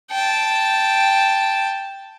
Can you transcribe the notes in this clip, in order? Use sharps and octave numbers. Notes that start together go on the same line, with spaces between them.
G5 A5